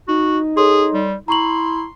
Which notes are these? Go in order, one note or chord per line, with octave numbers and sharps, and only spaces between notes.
D#4 F#4
G#4 A4 C#5 C6
G3
E4 A#5 C6 C#6 F#7